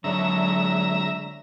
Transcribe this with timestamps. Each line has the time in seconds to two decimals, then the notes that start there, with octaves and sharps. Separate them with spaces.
0.04 D3 F#3 G#3 D4 D5 E5 A#5